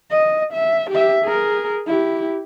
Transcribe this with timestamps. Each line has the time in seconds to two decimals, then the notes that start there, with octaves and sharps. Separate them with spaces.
0.11 D#5
0.53 E5
0.91 G4 E5
1.25 G#4 A#4
1.87 E4 G4